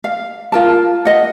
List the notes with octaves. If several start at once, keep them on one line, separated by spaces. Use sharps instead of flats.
F5
F4 A#4 A5
D#5 F#5